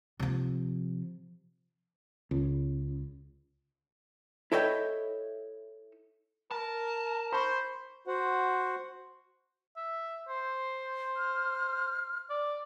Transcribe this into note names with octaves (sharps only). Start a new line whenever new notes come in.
C3 F3
C#2
E4 A4 C#5 D#5 E5 G5
A#4 A5
C5 B5 C#6
F#4 C5 F#5
E5
C5
F6
D5